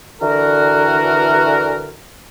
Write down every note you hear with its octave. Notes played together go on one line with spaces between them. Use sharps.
D3 E3 F#4 A#4